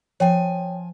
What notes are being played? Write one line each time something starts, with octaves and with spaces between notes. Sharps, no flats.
F3 C#5 G5 G#5